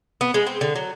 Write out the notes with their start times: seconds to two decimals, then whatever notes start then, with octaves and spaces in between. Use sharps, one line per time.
0.21 B3
0.34 G#3
0.47 C4
0.61 D3
0.76 F#3